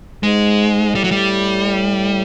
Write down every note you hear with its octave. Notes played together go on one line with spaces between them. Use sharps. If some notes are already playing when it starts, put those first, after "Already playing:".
G#2 G#3
A2 G3
F#3
G3